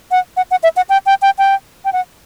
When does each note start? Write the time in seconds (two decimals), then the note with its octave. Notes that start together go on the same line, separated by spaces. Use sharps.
0.11 F#5
0.37 F#5
0.51 F#5
0.63 E5
0.77 F#5
0.89 G5
1.06 G5
1.22 G5
1.38 G5
1.85 G5
1.93 F#5